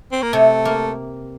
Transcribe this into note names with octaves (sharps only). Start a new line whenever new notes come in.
C4
A#3
C3 A3
A#3